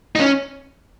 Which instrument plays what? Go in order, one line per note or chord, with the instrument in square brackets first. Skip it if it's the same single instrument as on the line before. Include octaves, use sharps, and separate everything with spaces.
[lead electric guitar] D#4
C#4